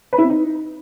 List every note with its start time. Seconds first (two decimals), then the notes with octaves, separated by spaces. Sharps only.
0.13 B4
0.18 E4
0.24 C4
0.30 D#4